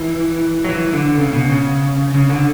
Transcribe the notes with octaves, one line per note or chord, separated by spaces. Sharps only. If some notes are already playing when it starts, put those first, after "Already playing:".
Already playing: E3
F#3
E3
D3
C#3
B2
C#3
C#3
D3